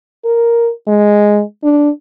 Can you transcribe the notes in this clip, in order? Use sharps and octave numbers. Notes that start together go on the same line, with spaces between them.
A#4
G#3
D4